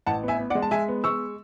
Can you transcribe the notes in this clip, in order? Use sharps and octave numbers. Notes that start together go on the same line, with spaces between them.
A1 F#5 A5
B3
E5 G#5
B3
D5 F#5
G#3
A5
G#3 E5 G#5
B3
G#3 C#6 E6